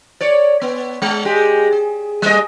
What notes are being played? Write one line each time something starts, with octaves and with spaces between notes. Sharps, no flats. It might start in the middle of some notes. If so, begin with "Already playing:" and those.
C#5 D5
B3
G#3
G#3 G4
G#4
G3 A3 D#5